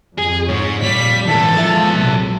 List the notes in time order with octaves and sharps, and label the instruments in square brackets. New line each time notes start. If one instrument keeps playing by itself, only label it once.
[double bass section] F2 [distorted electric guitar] G#4
[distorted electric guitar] G#2 [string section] C#5
[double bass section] F2 A#2 [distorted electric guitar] G3 [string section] B6
[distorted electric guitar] G#2 E3 [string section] A4
[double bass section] E3 F3 G#3 [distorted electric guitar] G#4 E5
[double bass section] A#1 C3 F#3